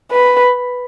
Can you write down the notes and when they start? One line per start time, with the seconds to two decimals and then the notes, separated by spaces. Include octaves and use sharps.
0.12 B4